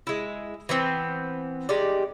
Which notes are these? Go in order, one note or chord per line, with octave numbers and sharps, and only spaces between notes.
G#3 E4
E3 B3 C4
G#3 D#4 G4 D5